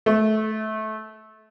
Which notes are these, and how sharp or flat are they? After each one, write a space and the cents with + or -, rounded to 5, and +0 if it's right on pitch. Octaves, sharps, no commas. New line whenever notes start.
A3 -20